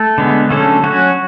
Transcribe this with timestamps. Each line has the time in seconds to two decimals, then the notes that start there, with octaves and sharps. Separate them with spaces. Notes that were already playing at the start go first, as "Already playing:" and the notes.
Already playing: A3 A4
0.18 D3 G#3 B3
0.50 D3 F#3 A3 C#4 A4
0.83 F#3 C#4 F#4